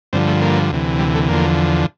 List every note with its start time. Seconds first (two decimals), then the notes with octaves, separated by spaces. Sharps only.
0.13 G2 D3 F3 C4
0.28 A3
0.42 A#3
0.71 D2 C3 E3
0.99 G3
1.15 A3
1.28 E2 D3 F3 A#3